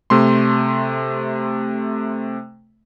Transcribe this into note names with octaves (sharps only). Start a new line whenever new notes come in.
C3 A3 C6